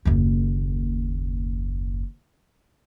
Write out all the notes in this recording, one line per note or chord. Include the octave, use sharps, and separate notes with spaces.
F#1 D#2